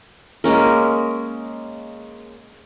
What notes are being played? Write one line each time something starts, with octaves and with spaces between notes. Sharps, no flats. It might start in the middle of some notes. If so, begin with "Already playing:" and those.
G#3 A#3 C#4 A#4